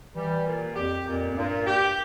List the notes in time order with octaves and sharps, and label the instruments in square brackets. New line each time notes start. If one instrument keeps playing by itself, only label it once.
[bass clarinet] E3 [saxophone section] G3
[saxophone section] A#2
[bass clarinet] F2 [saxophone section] G4
[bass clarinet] F2 [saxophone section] A#2
[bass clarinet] F2
[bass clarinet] G2 [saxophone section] A#2
[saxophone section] G4